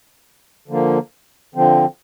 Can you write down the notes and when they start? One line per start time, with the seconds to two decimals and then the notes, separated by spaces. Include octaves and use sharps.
0.68 D3 F3 A#3
1.55 D3 F3 C4